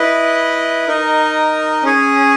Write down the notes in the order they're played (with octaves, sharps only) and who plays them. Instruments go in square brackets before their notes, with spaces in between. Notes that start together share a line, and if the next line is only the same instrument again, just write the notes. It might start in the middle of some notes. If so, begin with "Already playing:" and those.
Already playing: [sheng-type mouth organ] E4 B4 D#5
D#4 A#4 D#5
C#4 G#4 C#5 G#5